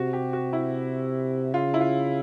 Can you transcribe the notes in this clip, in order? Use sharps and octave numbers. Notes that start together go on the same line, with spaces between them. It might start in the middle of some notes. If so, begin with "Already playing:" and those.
Already playing: C3 F#4
G4
F#4
E4
C#3 F4
E4
F4